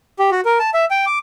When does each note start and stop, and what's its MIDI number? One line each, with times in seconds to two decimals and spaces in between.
0.19 0.30 67
0.31 0.41 66
0.45 0.58 70
0.59 0.70 81
0.74 0.85 76
0.91 1.05 79
1.06 1.19 86